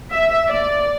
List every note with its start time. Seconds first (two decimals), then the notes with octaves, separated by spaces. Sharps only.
0.13 E5
0.49 D5